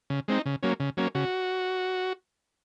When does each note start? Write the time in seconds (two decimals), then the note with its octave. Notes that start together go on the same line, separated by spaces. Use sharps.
0.10 C#3
0.28 G#3 C4 D#4
0.46 C#3
0.63 F#3 A#3 C#4
0.80 C#3
0.97 F#3 A#3 C#4
1.15 C#3 F#4